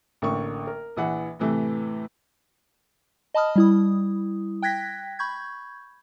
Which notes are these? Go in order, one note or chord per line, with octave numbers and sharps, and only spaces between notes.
A1 D3 A#3 C#6
A#4
A#1 E3 F#5
A2 C3 E3 A3
D#5 A5 B5 D#6 F6
G3 E4 D#6
G5 F#6 G#6 A#6 B6
B5 C#6 G6 G#6